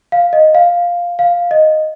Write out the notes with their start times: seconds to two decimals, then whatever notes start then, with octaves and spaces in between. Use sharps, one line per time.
0.12 F5
0.33 D#5
0.55 F5
1.19 F5
1.51 D#5